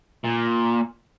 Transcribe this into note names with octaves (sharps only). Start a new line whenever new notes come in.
A#2